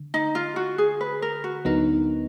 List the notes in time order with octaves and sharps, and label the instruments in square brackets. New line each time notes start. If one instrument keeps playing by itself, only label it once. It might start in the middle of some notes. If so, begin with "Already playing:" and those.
Already playing: [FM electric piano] D3
[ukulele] D#4
F4
F#4
G#4
B4
A#4
F#4
[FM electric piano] D2 D3 F#3 B3 D#4 [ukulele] A#4